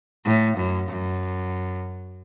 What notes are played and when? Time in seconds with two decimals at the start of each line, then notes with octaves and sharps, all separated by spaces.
0.25 A2
0.56 F#2
0.89 F#2